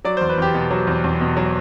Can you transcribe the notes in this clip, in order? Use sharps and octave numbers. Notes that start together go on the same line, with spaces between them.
F#3 D5
E2 C5
B4
E2 G4
B2
F#3
E2
E2
B2
F#3